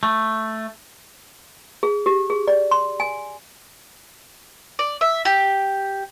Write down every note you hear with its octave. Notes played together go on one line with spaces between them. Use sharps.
A3
G#4
G4
G#4
D5
C6
G#5
D5
E5
G4